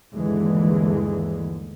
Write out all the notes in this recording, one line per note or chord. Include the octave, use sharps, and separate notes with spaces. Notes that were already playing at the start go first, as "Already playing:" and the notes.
G1 D#2 D3 E3 G#3